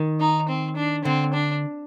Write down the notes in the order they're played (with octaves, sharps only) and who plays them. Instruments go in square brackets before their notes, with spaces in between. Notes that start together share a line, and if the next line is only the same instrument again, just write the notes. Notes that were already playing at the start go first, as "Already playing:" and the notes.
Already playing: [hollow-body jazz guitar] D#3
[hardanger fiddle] D#4
C4
D4
[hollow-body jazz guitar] D3 [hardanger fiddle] C4
[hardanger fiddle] D4